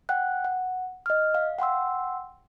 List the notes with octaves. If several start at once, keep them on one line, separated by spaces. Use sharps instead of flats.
F#5 G5 F#6
F#5
D#5 F6
F5
F#5 G5 C6 E6